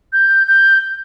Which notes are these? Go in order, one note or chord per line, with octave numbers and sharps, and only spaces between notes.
G6
G6